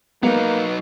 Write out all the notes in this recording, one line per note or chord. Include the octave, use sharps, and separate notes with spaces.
F#3 G#3 A#3 B3 D#4 B4